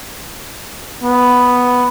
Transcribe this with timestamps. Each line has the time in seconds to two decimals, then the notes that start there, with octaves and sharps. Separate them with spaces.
1.04 B3